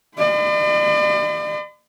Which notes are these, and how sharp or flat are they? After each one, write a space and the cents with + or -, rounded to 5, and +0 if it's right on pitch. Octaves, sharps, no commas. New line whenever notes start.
D5 +45 B5 +45